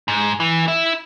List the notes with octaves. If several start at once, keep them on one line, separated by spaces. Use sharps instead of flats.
G#2
E3
E4